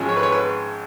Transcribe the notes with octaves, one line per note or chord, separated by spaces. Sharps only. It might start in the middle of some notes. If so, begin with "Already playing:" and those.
Already playing: G#1 G#2 F3 G#3 C#4
C#5
B4
C#5
B4